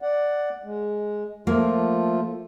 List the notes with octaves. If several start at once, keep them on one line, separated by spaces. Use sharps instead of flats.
D5 F#5
G#3
F3 A3 A#3 F4